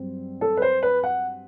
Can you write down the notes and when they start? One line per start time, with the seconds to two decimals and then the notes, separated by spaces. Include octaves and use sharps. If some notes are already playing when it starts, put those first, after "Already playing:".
Already playing: G2 F#3 C4
0.41 A4
0.57 B4
0.62 C5
0.83 B4
1.03 F#5